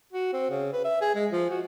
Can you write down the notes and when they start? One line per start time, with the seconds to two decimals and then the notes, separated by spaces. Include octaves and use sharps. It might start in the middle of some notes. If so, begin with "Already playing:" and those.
0.13 F#4
0.33 C4
0.50 C#3
0.73 B4
0.85 E5
1.01 G#4
1.15 G#3
1.32 F3
1.50 F#4